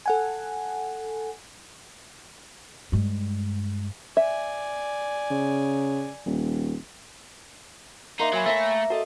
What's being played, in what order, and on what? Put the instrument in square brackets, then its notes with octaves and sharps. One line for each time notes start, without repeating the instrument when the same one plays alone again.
[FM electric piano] A4 F#5 G#5
[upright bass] G2 G#3
[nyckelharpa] D5 G#5 [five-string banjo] E5
[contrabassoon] C#3
D#1
[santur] A#3 [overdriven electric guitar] D#4 [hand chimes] E5 C6 C7
[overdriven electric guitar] F#3 [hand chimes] C#5 G#5 B5
[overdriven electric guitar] A3 [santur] E5 A#5 C#6 [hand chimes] E6 A#6
[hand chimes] F#4 A4 D#5 [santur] A5